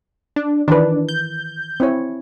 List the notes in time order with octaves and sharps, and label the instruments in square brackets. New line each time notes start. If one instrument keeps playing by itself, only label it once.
[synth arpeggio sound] D4
[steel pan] D#3 E3 B4 [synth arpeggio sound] D4
[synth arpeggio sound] G6
[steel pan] C4 E4 C#5